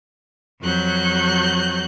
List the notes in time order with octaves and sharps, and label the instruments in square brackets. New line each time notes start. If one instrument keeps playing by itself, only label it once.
[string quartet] F2 F#3 F#6 G6